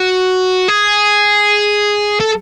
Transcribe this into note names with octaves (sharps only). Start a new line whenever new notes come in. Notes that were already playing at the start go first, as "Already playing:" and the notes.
Already playing: F#4
G#4
A4